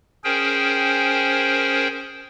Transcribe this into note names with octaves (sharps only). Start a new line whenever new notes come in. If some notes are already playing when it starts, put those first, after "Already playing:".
C#4 G#4 A#4 C5 G5